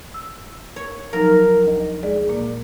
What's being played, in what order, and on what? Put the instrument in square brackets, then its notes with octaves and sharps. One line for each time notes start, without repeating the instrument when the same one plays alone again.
[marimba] E6
[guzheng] C#5
[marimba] F3 F#3 D#4 [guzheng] A#4
[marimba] D2 D#5
G#3 G#4 D5
A#2 A#3